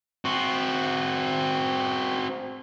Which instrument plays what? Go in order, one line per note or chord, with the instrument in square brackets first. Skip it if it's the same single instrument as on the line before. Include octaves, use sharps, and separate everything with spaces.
[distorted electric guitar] C4 F#4